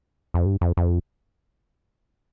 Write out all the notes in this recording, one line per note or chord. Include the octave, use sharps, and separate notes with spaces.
F2
G2
F2
F2